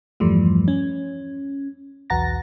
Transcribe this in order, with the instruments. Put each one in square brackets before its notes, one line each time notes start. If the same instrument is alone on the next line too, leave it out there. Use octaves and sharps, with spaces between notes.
[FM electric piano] E2 G2 E3 F3 G3 A3
C#4
B1 E2 F#5 A#5 A6 A#6